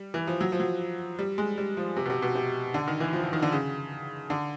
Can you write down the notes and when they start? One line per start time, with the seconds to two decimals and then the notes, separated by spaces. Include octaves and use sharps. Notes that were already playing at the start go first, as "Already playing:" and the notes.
Already playing: G3
0.14 E3
0.27 F3
0.41 F#3
0.52 F3
0.60 F#3
1.19 G3
1.38 G#3
1.58 G3
1.77 F3
1.97 C3
2.05 B2
2.10 C3
2.22 B2
2.35 C3
2.74 D3
2.88 D#3
3.00 E3
3.13 F3
3.23 F3
3.33 D#3
3.42 D3
3.52 C#3
4.30 D3